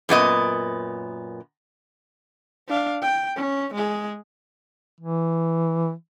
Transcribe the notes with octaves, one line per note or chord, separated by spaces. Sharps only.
F#2 A#2 B3 D#5
D4 F5
G5
C#4
G#3 G#4
E3